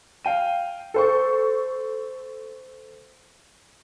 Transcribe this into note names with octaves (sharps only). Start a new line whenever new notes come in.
F5 G5 D#7
A4 C5 C#6